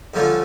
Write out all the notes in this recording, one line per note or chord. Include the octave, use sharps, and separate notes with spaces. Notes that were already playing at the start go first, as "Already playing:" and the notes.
G2 D3 F3 A3 C#4